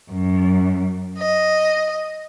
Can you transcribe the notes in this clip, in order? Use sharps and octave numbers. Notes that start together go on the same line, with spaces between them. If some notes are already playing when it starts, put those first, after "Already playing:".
F#2
D#5